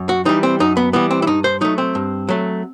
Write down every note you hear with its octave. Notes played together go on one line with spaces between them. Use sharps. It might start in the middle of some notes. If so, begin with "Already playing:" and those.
Already playing: F#2
F#4
E3 G3 D#4
C4
F#2 D#4
B3
E3 G3 B3
C4
E4
G2 D#4
C5
F#3 A3 D#4
C4
G2
F#3 A3